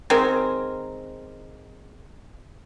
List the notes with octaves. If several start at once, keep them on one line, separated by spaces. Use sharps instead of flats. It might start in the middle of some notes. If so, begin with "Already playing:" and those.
D#3 G#3 C4 A#4